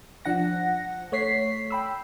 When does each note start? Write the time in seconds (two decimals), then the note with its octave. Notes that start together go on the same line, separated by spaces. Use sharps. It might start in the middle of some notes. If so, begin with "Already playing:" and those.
0.25 F3 D4 F#5 A#6
1.12 A3 C#5 B6 C7
1.71 G5 B5 E6